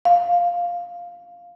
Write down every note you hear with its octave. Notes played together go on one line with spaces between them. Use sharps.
F5